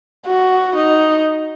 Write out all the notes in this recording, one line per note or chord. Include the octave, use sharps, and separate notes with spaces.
F#4
D#4